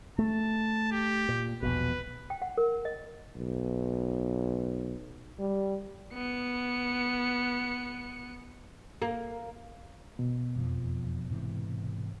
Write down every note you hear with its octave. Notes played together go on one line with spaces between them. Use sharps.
A3 A5
G4
A#2
E1 A#1 B2 B4
G5
F#5
A#4
D#5
B1
G3
B3 C#7
A#3
B2
E1 F2 F3
G#2 C3 E3